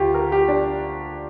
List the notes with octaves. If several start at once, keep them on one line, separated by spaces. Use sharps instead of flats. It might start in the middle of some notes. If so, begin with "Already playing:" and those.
Already playing: D2 F4 G4
A#4
G4
D4